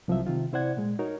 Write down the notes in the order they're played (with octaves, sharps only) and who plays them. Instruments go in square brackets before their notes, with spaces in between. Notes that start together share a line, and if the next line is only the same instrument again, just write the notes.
[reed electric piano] C2 F3 F#3 E5
C3 D#3 F4
C3 E4 C5 D5 F#5 G#6
A#2 G#3
D#4 F#4 A#4 C#5